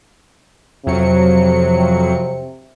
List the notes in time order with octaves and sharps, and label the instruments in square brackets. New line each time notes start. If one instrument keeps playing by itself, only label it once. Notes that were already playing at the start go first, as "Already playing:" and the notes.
[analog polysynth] F2 F#3 C#7 [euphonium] C3